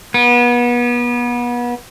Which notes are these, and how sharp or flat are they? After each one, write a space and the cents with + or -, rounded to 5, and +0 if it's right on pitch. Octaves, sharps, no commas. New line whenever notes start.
B3 -30